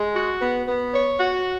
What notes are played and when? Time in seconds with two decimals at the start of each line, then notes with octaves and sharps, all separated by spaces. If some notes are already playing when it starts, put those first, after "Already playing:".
Already playing: G#3
0.15 F#4
0.42 B3
0.68 B3
0.94 C#5
1.20 F#4